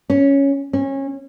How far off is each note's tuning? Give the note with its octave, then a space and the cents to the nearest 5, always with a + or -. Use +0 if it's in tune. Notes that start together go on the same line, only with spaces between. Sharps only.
C#4 +0
C#4 -25